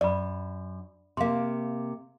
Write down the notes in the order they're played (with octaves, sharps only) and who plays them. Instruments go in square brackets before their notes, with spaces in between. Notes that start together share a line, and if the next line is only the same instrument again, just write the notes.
[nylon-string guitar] F#2 [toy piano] D5 B5
[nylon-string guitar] C3 A#3 [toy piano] F5 C6